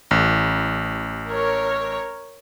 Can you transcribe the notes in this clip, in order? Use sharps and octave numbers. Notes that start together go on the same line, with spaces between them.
A1
A#4 C#5